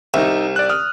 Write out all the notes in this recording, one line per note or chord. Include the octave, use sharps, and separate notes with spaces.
C2 D#4 E5
D5 F#6
D#6 F6